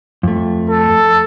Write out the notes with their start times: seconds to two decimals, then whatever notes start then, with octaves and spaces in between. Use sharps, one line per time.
0.23 F2 A3
0.70 A4